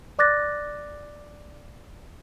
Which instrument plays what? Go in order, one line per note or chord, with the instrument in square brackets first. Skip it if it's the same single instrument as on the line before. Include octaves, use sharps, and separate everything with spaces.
[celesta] D5 D6 F#6 A6 A#6